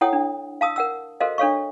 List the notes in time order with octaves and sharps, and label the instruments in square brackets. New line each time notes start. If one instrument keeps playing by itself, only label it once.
[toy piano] E4 A4 C#5 F#5 G5 D#6
D4
F5 A5 D#6 E6
A#4 F#5 E6
F#4 A4 A#4 C5 D#5 F5
D4 A4 C#5 F5 C#6